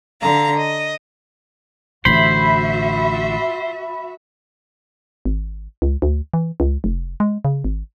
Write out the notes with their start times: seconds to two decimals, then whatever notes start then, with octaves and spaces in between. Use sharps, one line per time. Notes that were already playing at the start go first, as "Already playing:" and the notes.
0.20 D3 F5 A#5
0.56 D#5
2.05 A1 D3 F#4 C5 E5 B5
5.25 G#1
5.82 C#2
6.02 D2
6.34 E3
6.60 C#2
6.84 F1
7.20 G#3
7.45 C#3
7.64 G#1